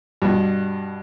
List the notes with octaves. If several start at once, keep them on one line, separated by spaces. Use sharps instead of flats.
G2 B2